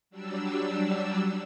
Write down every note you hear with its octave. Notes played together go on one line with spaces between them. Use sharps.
F#3 G3 D4 E6